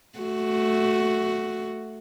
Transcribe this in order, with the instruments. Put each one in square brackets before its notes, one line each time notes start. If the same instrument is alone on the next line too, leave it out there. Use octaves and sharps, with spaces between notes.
[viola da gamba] A3 F#4